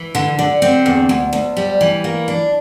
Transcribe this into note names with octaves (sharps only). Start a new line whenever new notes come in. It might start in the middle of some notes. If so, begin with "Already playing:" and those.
Already playing: E3
D3
D3
C4
E2
D2
D2
G3
E3
A#3
D4